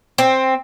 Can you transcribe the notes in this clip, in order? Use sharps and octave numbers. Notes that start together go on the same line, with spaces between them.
C4